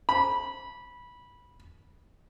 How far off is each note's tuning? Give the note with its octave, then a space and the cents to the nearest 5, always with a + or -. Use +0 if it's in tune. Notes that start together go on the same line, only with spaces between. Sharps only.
B5 -15